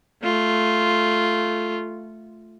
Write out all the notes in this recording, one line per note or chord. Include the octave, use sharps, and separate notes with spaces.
A3 F4